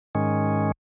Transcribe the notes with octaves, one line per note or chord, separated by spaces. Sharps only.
G#2 D#3 G#3 C#4